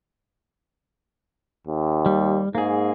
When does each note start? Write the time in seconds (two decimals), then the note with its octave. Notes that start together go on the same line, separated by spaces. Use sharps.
1.67 D#2
2.06 G3
2.55 G#2 A#3 G#4